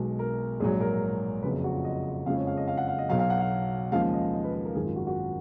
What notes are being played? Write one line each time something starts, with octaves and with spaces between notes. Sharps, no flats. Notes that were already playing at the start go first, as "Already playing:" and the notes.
Already playing: B1 B2 G#3
A#4
A#1 G#2 F#3 G#4
A#4
F#1 F2 C#3 F#3 B4
F#4
F4
D#5
F#1 F2 C#3 F3 G#3 F5
C#5
F5
D#5
F5
F#5
F5
D#5
B1 B2 F#3 F5
F5
F#5
F5
D#2 C#3 F3 G#3 F5
D#5
D#5
B4
B4
A#4
G#1 F#2 D#3 G#3 G#4
F4
F#4
F#4